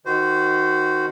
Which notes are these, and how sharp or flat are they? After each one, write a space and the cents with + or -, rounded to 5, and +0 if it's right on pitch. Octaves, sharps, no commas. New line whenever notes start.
D#3 +0 F#4 +0 C5 -20